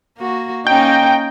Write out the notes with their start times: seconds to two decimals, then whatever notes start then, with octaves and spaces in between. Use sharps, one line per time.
0.18 A#3 F#4
0.67 A#3 C#4 D#4 G5